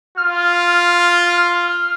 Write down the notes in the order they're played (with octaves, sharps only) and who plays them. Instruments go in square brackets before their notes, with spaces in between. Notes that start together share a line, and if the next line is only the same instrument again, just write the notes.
[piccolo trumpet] F4 [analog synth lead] F6